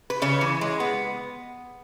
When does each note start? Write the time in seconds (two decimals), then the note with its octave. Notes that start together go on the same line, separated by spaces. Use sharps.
0.10 B4
0.22 C#3 C#5
0.41 E3
0.61 G#3
0.80 B3